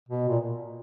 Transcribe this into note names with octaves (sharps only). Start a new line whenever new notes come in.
B2
A#2